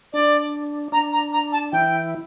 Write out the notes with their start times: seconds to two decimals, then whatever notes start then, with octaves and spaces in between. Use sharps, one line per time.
0.13 D4 D5
0.92 D4 A#5
1.13 A#5
1.33 A#5
1.53 A5
1.72 E3 E4 G5